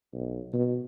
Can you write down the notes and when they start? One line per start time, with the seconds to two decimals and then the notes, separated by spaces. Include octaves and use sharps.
0.14 B1
0.54 B2